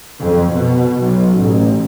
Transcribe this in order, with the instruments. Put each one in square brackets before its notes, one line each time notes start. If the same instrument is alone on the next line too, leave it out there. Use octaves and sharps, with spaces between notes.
[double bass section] F2
B2
B1
A1